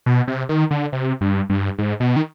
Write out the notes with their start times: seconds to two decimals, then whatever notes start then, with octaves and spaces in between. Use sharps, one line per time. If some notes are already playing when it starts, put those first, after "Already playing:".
0.06 B2
0.27 C3
0.49 D#3
0.71 D3
0.92 C3
1.21 G2
1.49 G2
1.78 G#2
2.00 B2
2.16 D#3